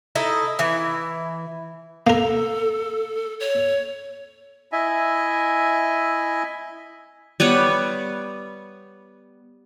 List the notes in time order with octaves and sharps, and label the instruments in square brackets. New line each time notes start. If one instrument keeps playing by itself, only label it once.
[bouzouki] D#4 E4 A4 D#5
E3 E4
[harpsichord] A#3 A#4 [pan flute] A4
[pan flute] C#5
[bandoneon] E4 D#5 E5 G#5
[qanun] G3 B3 B4 C#5